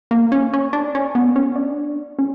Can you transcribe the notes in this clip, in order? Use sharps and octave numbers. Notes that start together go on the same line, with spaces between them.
A#3
C#4
C#4
D4
C#4
B3
C#4
D4
C#4